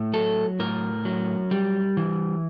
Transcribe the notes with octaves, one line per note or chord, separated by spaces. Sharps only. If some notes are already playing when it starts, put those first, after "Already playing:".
Already playing: A2
F#3 A4
A2 A#4
F#3
G3
E3